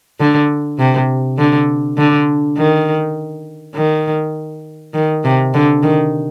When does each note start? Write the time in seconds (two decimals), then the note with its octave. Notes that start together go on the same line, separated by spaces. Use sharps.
0.20 D3
0.79 C3
1.38 D3
1.98 D3
2.57 D#3
3.75 D#3
4.94 D#3
5.24 C3
5.54 D3
5.83 D#3